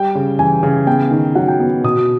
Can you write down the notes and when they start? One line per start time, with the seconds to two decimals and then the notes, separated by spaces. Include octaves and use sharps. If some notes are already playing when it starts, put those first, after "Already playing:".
Already playing: G3 G5
0.15 C#3
0.39 E3 G#5
0.63 C#3
0.87 B3 G5
1.11 D#3
1.35 F#3 F#5
1.48 G5
1.60 B3
1.84 B2 D#6